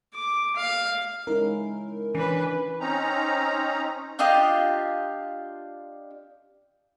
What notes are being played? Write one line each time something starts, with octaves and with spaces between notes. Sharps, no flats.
D6
F5
G#3 C#4 D#4 E4 A#4
E3 C#4 D4 B4
C4 C#4 D#4 A#5
D4 F4 G4 D#5